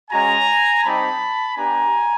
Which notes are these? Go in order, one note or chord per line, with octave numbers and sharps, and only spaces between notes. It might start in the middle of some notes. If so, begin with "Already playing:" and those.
G#3 C#4 F#4 G#5 A#5
G3 C4 D#4 G4 A5 B5
B3 D4 G4 G#5 A#5